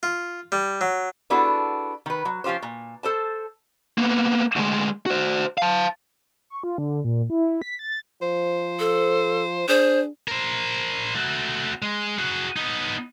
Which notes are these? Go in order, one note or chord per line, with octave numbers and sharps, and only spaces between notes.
F4
G3
F#3
B3 D4 E4 F#4 G#4 A4
D#3 B4
F#3
F3 C#4 F4 G4 C5
A#2
A4 C5 A5
A#3 B3
D2 G#3
F#4 C5
F5 A5
C#6
F4
D3
A#2
E4
B6
A6
F3 C5
A4
D4 G#4 C5
A#4 C5
A3 F#4
G#3
F#4 G#4
B3 D#4